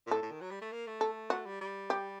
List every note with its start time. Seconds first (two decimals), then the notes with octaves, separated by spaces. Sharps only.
0.07 A#2
0.11 A2 A4
0.22 A2
0.31 D#3
0.41 F#3
0.51 G3
0.61 A3
0.72 A#3
0.87 A3
1.01 A4
1.30 A3 F#4
1.46 G3
1.61 G3
1.90 G4